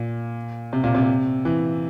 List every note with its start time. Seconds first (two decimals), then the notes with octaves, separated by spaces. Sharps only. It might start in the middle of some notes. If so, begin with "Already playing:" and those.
Already playing: A#2
0.73 C3
0.84 A#2
0.95 C3
1.45 E3